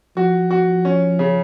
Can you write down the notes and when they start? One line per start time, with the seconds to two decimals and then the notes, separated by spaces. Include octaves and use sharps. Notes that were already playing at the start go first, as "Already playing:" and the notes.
0.17 F3 F#4
0.51 F#4
0.85 C#4
1.19 C#3